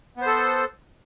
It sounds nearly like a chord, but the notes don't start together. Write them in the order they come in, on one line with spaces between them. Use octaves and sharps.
B3 C5 A4